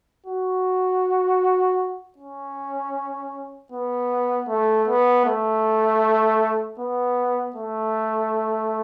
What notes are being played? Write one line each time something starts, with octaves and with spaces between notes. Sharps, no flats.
F#4
C#4
B3
A3
B3
A3
B3
A3